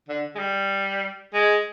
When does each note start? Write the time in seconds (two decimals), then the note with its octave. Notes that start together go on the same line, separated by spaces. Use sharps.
0.08 D3
0.35 G#3
0.39 G3
1.33 G#3